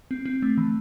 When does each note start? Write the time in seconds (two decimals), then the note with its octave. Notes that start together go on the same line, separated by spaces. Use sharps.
0.11 C4
0.26 C4
0.42 A3
0.57 E3